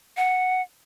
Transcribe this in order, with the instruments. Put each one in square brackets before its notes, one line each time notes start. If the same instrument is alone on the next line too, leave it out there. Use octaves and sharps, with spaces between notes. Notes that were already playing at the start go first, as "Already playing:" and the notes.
[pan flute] F#5